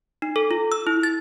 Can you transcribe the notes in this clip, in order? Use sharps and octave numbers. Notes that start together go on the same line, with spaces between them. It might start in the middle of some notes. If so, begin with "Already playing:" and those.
D#4
A4
F4
E6
E4
A6